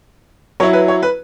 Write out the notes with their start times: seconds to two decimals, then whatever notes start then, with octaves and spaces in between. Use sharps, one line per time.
0.60 F#3 E4 C#5
0.73 B4
0.88 C#5
1.02 B4